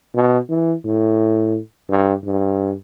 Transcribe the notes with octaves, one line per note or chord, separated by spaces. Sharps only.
B2
E3
A2
G2
G2